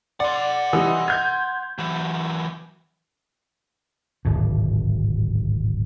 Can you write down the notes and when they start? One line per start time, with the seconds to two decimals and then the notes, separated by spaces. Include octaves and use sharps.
0.20 D5 F#5 C6
0.73 E3 G3 D#4
1.08 G6 G#6
1.79 E3 F#3
4.25 D1 G#1 B2